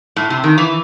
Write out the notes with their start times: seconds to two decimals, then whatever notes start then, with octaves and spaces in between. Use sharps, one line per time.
0.16 A2
0.30 C3
0.44 D#3
0.58 E3